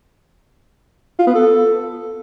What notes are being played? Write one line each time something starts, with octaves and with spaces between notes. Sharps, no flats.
F4
B3
A4